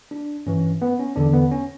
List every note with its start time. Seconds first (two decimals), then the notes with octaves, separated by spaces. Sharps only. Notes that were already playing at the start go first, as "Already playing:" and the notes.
0.11 D4
0.46 G2 E3 C#4
0.82 B3
0.99 C#4
1.16 E2 D3 D4
1.33 B3
1.51 C#4